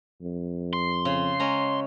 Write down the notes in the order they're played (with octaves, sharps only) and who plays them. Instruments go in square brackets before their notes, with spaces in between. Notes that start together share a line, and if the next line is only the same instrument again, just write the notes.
[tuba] F2
[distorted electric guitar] C6
[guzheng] C#3
G#3 C#4 A#5